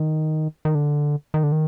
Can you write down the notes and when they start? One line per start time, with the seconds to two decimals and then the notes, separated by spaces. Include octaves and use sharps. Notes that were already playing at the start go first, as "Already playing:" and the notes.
Already playing: D#3
0.65 D#3
0.75 D3
1.34 D#3
1.43 D3
1.52 D#3